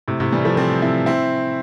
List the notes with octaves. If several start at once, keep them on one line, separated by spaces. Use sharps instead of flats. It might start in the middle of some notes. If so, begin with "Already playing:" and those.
A2 C3
A2 C3
E3 G3
F3 A3
A3 C4
C4 E4
C4 E4